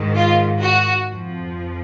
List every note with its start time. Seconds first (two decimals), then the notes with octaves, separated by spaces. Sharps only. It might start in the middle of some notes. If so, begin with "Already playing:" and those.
Already playing: G#2 D#3
0.15 F4
0.62 F#4
1.10 F2 F3